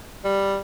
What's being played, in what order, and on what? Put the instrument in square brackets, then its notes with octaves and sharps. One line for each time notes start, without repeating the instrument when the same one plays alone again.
[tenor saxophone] G3